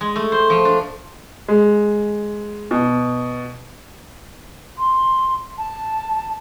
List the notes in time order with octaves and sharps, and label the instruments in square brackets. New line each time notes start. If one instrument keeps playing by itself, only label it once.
[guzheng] G#3
A3
C5
F3
D4
[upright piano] G#3
B2
[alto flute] C6
A5